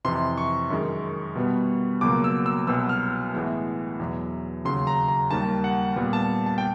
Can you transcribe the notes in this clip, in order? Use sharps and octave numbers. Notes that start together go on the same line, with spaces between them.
F2 C3 E3 C6
C#6
F#2 D#3 G#3
B2 G3 B3
C#2 B2 F#3 A#3 D6
E6
E6
C2 B2 F#3 B3 E6
F6
A2 E3 G#3 B3
E2 B2 F#3
D#2 C#3 F#3 C6
A#5
A#5
D#2 D#3 G3 A#3 A5
F#5
A#2 G3 B3
A5
A5
G5